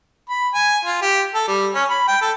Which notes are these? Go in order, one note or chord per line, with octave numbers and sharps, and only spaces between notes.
B5
G#5
F4
G4
A4
G3
C#4
B5
G5
A4